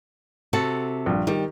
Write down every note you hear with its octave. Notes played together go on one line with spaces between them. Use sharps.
C3 F#4 A4
A#1 G2
D#3 G3 G4